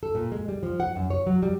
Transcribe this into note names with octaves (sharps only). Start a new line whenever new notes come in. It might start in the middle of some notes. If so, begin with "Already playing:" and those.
A4
A#2
G#3
G3
F3
F#5
F#2
C#5
F#3
G3